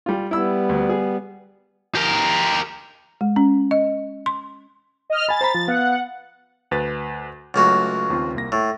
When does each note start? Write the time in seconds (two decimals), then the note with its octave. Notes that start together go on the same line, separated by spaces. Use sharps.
0.06 G3 F4
0.31 G3 B3 E4 E6
0.69 D2
0.89 G#4
1.95 G4 A#4
3.21 G#3
3.36 C#4
3.71 D#5
4.26 C6
5.10 D#5 F6
5.29 G#5 B5 A6
5.41 C5 A#5 B5
5.54 F3
5.68 B3 F5 F#5
6.71 D2 B4 A6
7.54 C#2 F#3 A3 A#3 F#4 F#5
8.10 D#2 C4 F4
8.34 C2 A#3 A#6
8.52 A2 E6